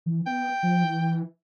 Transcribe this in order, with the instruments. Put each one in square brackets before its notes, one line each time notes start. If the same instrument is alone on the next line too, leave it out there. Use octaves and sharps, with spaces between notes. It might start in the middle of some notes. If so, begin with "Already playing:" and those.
[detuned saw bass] E3
[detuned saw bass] B3 [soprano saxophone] G5
[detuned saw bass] F3
E3